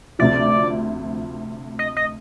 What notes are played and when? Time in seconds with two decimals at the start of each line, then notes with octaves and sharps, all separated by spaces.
0.19 D2 C3 F3 D5
1.79 D#5
1.97 D#5